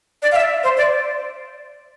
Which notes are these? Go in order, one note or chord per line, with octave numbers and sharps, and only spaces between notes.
D5
F5
E5
C5
D5